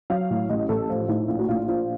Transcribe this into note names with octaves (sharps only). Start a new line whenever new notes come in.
F#3 F5
A2
A1 D#5
A1 A4
F3 F4
A2 D#4
A#1 F4
F#4
A#1 F4
F3 F4